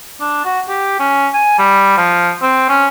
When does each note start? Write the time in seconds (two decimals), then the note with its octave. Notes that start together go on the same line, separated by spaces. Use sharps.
0.21 D4
0.45 F#4
0.69 G4
1.00 C#4
1.34 G#5
1.59 G3
1.97 F3
2.42 C4
2.69 C#4